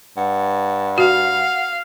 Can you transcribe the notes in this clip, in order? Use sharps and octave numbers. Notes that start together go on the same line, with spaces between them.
G2 F#5
F#4 F5